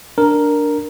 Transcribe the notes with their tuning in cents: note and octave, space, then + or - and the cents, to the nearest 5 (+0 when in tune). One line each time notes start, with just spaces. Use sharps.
D4 +0 A#4 +0